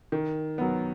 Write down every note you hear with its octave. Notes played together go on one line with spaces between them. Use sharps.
D#3
F#3 B3